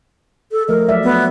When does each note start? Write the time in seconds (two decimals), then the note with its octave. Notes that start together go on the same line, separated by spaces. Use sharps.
0.52 A4
0.68 F3 A3 A#4 D#5
0.89 F#3 D5 E5
1.04 B3